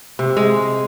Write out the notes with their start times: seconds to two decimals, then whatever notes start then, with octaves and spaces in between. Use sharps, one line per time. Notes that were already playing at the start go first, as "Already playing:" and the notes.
0.19 C3
0.37 G#3